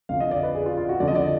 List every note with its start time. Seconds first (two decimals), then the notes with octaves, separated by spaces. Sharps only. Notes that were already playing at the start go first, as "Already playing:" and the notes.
0.09 F2 D3 F3 F5
0.20 D#5
0.31 D5
0.43 B4
0.55 G#4
0.66 F4
0.77 F4
0.89 F#4
1.00 F2 D3 F3 D5
1.08 D#5
1.15 D5